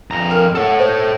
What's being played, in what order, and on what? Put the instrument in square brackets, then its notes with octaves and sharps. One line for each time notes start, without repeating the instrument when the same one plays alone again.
[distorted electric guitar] F2 A#5
[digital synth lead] A#4
[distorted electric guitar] A4 C#5 [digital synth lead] F#5
[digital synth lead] C5